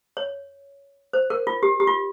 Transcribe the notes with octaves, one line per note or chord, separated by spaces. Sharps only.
C#5
C5
A#4
F4
G4
G4
F4